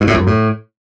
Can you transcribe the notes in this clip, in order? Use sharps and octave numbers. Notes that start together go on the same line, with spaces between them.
G2
A2
E2
F#2
A2